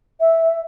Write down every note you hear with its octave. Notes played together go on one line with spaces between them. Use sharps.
E5